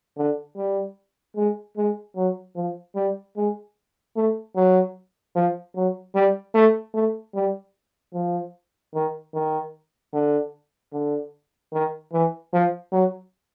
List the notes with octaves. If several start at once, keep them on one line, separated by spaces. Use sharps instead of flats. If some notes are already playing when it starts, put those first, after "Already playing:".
D3
G3
G#3
G#3
F#3
F3
G3
G#3
A3
F#3
F3
F#3
G3
A3
A3
G3
F3
D#3
D#3
D3
D3
D#3
E3
F3
F#3